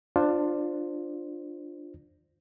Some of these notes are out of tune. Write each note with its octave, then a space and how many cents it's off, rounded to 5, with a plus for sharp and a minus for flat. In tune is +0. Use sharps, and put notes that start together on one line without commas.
D4 +15 F4 +0 C5 +5